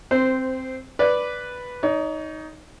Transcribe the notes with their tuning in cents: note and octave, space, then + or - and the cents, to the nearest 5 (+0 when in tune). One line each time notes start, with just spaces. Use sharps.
C4 +0 C5 -15
B4 +0 D5 +0
D#4 +5 C#5 +40